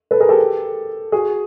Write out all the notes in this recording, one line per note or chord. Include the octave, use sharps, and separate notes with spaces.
A4 B4
G#4 A#4
G4 A4
F#4 G#4